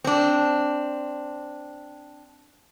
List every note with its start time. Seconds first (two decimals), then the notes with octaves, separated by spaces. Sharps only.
0.04 C4 D4